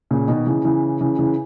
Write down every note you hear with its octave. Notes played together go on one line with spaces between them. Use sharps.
A#2 C#3
B2 D#3
C#3 E3
C#3 E3
C#3 E3
C#3 E3